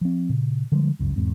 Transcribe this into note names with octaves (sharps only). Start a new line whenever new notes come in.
F3 C4
A#2 C#3
D3 F3 G3 G#3
G1 C#2 F#2
E1 E2 G#2 C4